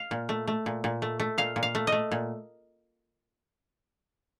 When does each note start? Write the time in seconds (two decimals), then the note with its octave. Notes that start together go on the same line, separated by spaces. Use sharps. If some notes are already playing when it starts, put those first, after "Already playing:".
Already playing: F5
0.11 A#2
0.29 A3
0.47 A3
0.66 A#2
0.84 A#2
1.02 A3
1.20 A3
1.38 A#2 F5
1.56 A#2
1.63 F5
1.75 A3
1.87 D#5
1.92 A3
2.12 A#2